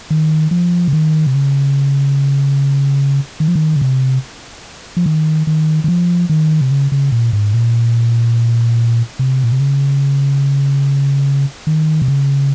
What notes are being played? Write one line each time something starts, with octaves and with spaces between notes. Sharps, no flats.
D#3
F3
C#3
D#3
C3
C#3
D#3
F3
D#3
C#3
C3
F3
D#3
D#3
D#3
F3
D#3
C3
C#3
C#3
A#2
G#2
A#2
C3
A#2
C3
C#3
D#3
C3
C#3